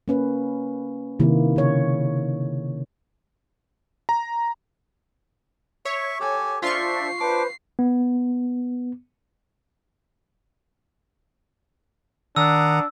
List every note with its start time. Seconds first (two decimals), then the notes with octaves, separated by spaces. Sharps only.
0.08 A#3 C#4 B4
1.20 C3 D#3 A#3 E4
1.56 C#3 C#5
4.09 A#5
5.85 C#5 E5 C#6
6.20 G4 A4 G#5
6.63 D4 F4 C5 E5 C6 C#6 C7
7.20 D4 B4 C5 D6
7.79 B3
12.36 D#3 D4 F#5 A#5 D#6 E6